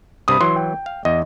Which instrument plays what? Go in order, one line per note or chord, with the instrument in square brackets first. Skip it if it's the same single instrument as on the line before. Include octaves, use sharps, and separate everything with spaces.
[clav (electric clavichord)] C2 G2 C3 [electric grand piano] B5 D#6
[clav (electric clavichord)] E3 F#3 [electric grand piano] C6
[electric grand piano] G5
[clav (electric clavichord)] F5
[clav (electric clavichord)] E2 [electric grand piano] D#5